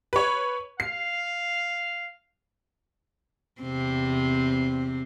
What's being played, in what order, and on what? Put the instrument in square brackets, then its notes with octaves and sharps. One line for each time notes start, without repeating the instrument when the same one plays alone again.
[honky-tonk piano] B4 C#5
[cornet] F5 [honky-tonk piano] C7
[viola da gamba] E2 C3 C4